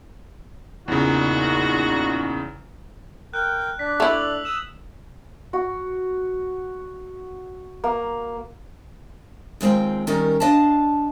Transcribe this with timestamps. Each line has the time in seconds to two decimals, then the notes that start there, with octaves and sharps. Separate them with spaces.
0.88 E2 A#2 C#3 D#4 F#4
3.34 A#4 G5 F#6
3.79 D4 D5 B6
4.00 A3 E4 F7 F#7
4.19 E6
4.45 D#6 E6 E7
5.53 F#4
7.84 A#3
9.61 D#2 G#3 C4 F4 G5
10.07 D#3 G3 C#4 G4 A#4
10.40 D4 D#5 F5 A5